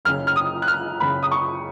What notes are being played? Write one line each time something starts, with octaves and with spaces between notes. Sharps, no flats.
F#1 F#2 C#3 F6
F6
D#6
F#6
F6
F#1 F#2 C#3 B5
D#6
C#6